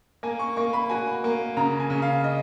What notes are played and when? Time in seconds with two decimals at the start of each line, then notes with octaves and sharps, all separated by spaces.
0.23 A#3 G#5
0.39 C#6
0.56 A#3 C#6
0.73 B5
0.90 F#4 G#5
1.24 A#3
1.57 C#3 A#5
1.80 G#5
1.90 C#3
2.02 F5
2.24 D#5